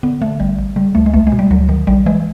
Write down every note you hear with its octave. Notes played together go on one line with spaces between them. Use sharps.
D3 B3
D3 A3
A1 G3
A1
C#3 G3
D2 A3
G#3
C2 A3
G#3
B2
G3
D2 F#3
D#3
A#1 G3
E3 G#3